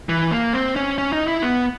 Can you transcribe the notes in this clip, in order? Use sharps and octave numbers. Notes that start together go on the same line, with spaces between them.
E3
A#3
C4
C#4
C#4
D#4
E4
B3